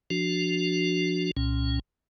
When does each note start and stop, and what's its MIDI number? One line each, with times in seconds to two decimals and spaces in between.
0.10 1.31 53
0.10 1.31 62
0.10 1.31 66
1.37 1.79 36
1.37 1.79 46
1.37 1.79 61